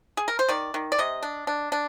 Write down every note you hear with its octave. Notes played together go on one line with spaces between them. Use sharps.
G#4
A#4
C5
D#3 D5
D#3
D5
C3 D#5
D4
D4
D4